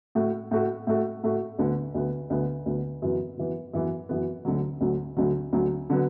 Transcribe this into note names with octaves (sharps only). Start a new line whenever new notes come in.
A2 A3 F#4
A2 A3 F#4
A2 A3 F#4
A2 A3 F#4
D2 D3 B3
D2 D3 B3
D2 D3 B3
D2 D3 B3
F#2 E3 B3
F#2 E3 B3
F#2 E3 B3
F#2 E3 B3
D2 D3 F#3
D2 D3 F#3
D2 D3 F#3
D2 D3 F#3
D3 F#3 B3